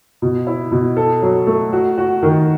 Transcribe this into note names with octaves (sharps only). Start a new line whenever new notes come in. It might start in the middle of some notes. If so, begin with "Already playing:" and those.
B2
E4
B2
A4
F#3
A3
F#4
F#4
D#3